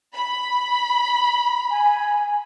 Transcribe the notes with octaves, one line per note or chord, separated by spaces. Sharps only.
B5
G#5